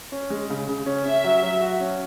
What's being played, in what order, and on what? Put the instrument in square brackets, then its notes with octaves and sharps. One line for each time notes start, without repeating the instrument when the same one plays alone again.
[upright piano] C#4
G#3
C#3
C#3
C#4
[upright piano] C#4 [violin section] E5
[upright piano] F#3
F#3
F#4
C#4